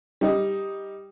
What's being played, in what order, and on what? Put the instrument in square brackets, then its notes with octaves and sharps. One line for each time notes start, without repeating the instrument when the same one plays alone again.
[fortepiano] G3 D#4